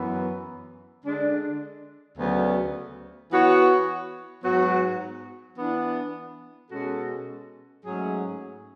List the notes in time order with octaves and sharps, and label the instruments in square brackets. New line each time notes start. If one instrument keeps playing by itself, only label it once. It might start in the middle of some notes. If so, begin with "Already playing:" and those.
Already playing: [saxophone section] F#2 E3 B3
D3 G#3 D4
D2 C#3 F#3 B3
E3 B3 F#4 C#5
G#2 F#3 B3 F#4
E3 B3 D4
B2 G#3 C#4 F#4 A4
G#2 F#3 A3 C#4 G#4